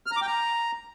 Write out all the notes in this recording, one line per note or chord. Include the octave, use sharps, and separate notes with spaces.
F6
A#5
D6
G5
A#5